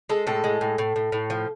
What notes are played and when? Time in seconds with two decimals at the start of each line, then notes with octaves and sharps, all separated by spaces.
0.09 G#3 A4
0.27 A2 A4
0.44 G#3
0.61 A2
0.78 A2
0.96 A2
1.12 A2
1.30 F3